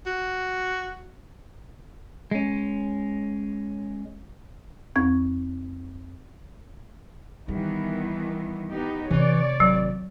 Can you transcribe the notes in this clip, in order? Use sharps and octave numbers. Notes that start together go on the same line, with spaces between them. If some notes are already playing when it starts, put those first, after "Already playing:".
F#4
G#3 C#4
F2 C4 C#6 G#6
D#3 E3 G3 B3
B3 D#4 G4
C3 E3 A3 C#5 D5
G#1 F#3